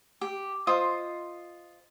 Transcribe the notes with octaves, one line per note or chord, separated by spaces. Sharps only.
G4
F4 C5 D#5 D#6